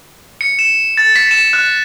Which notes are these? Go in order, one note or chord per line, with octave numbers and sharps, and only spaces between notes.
C#7
E7
A6
B6
E7
F#6